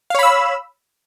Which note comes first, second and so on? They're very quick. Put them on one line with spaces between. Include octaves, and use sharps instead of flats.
F5 C#5 B5 E6